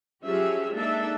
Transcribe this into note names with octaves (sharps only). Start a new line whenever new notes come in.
F3 F#3 C#4 G4 G#4 E5
G#3 A#3 D4 D#4 A4 E5